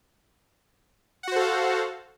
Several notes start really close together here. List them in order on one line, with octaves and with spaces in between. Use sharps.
F#5 F#4 C5 A4 F5